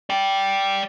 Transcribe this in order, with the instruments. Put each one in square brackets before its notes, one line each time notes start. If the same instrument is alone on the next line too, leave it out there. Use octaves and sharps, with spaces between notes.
[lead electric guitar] D5 G5